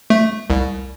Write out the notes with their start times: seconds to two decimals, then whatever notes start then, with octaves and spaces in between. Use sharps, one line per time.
0.10 A3
0.50 C2